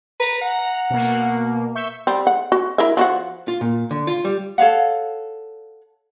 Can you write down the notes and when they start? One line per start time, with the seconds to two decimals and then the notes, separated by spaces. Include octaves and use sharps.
0.20 B4 A#5
0.41 F#5
0.90 B2 A#3
1.75 E5 C#6 G6
2.07 G3 C4
2.27 F#5
2.52 F#4
2.78 E4 A#4 E5
2.97 F3 F#4 F#5
3.48 F4
3.61 A#2
3.91 D3
4.07 F4
4.25 G3
4.58 A4 C#5 F5 F#5